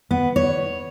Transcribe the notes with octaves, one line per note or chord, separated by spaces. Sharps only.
B3
C#5